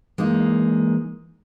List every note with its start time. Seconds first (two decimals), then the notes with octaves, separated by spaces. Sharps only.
0.18 E3 G#3 A#3 D#4